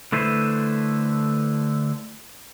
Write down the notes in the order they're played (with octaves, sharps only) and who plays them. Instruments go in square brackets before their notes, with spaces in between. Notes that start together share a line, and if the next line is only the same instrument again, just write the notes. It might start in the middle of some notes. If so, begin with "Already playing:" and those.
[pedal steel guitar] D3 A3 E4 B4 C5